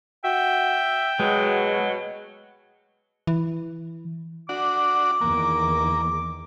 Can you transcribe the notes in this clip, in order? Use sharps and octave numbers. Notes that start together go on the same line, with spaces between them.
F#4 E5 G5
B2 F#3 G#3
E3
D4 F#4 D6
E2 D#3 A#3